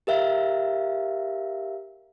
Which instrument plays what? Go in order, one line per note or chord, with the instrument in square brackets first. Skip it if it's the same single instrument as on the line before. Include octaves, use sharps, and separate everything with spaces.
[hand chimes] G4 A#4 E5 F5